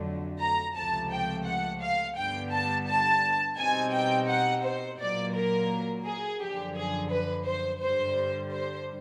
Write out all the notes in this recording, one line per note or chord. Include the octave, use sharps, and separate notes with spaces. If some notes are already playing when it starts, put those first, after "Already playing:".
Already playing: F2 D3 F#3 A3
A#5
C#2 C3 F3 A3 A5
G5
F#5
F5
G2 D3 G3 B3 G5
A5
A5
B2 G3 C4 D#4 G#5
G5
F#5
C5
A#2 F#3 A#3 D5
A#4
G#4
F#2 D3 F3 G4
G#4
B4
C5
G2 D3 G3 C5
C5